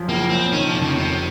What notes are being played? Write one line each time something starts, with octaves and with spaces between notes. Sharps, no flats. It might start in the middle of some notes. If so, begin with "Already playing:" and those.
Already playing: F#2 F3
F#1 A#3
F#1 C4
D#3 C#4
F3
F2
C#3
F1 C3